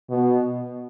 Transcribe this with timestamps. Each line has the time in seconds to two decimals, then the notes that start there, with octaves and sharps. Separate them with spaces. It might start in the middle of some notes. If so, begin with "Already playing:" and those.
0.10 B2